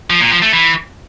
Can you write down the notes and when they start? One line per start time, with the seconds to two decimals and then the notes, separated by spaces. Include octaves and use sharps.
0.10 F3
0.21 A#2
0.31 F3
0.42 A3
0.53 E3